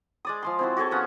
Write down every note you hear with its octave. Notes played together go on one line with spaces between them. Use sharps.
G#3 D5 D#6
F3 G#3 C6
C4 E4 F#4
F#4 G#4 A4 C#5
F3 B3 C#4 F#5